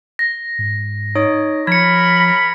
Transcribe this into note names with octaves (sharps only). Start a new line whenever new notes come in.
A#6
G#2
D#4 C#5 D#6
F3 A#4 C#5 B5 G#6 C#7